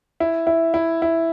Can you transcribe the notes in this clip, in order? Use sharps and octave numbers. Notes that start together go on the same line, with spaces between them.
E4
E4
E4
E4